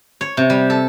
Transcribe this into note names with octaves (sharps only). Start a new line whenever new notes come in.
C#5
C3
G3
A4